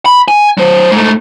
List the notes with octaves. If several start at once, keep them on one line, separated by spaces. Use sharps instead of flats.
B5
G#5
F#3 C5
G#2 A3